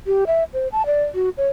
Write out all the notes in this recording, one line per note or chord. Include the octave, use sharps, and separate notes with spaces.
G4
E5
C5
A5
D5
F#4
C#5